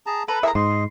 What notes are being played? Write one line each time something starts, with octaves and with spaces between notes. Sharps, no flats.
G#4 A5 A#5
A4 B4 A#5
E4 G#4 A#4 E5 A#5
G#2 D#5 C6